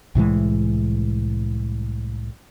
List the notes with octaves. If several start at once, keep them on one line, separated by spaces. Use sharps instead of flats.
C2 A2 E3 G#3